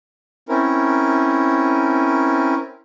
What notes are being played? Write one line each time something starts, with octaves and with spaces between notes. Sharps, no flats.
C4 C#4 E4 A#4